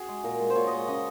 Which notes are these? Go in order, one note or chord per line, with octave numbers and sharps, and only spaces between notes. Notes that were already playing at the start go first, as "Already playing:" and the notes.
Already playing: F#4 G#4
G#3
A#2 A#4
G#3
C5
A#2 C#5
D#5
G#3
C#3 D#5